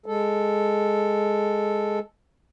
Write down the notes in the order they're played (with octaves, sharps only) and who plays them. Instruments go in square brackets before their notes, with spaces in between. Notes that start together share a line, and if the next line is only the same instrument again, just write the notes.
[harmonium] G#3 A4